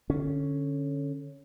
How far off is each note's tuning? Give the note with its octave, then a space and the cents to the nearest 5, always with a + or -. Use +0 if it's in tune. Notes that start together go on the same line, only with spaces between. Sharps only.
D3 +0 C#4 +0